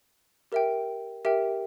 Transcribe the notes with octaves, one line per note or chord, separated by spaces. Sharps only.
G4 A#4 E5 G5
G4 A#4 E5 G5